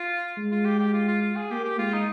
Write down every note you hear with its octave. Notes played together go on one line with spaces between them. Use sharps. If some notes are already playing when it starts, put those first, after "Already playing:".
Already playing: F4
G#3
F4
G4
G4
F4
F4
F4
G#4
A#3 G4
G4
G#3 F4
D#4